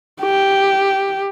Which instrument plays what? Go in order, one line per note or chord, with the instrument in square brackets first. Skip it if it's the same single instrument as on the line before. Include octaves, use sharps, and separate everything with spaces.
[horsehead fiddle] G4